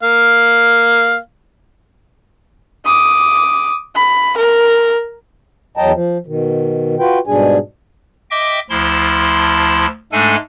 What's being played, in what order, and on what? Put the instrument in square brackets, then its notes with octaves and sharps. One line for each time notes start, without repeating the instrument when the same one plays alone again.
[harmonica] A#3 F5
[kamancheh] D6 D#6
B5
A#4
[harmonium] E2 F#3 D#5 G5 A5 A#5
F3
B2 D#3
F4 F#4 B4 G5
G#2 B2 G3 D4 G#4 G#5
[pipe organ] D#5 E5 G5 D6
D2 F3 E4 A5 C6
G#2 G#3 A3 D4 A4 G#5